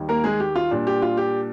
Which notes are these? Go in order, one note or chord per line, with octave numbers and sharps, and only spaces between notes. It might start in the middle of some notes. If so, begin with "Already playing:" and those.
Already playing: D#2 D#3 G3
A#3 A#4
G#3 G#4
G4
F4
A#2 G3 D4
G4
F4
G4